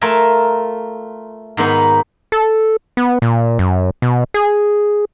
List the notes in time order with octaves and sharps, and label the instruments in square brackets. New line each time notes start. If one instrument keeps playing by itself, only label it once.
[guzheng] A3 F4 A#4 E5 G#5
G#2 D#3 B3 D#4 B5
[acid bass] A4
B3
A#2
F#2
B2
G#4